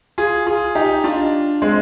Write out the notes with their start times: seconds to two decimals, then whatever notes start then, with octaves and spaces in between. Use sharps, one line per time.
0.18 F4 G#4
0.47 F4 G#4
0.75 D#4 G4
1.04 D4 F4
1.62 G#3 C4